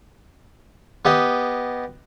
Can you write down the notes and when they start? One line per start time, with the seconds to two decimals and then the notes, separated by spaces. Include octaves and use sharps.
1.05 B3 G4 D#5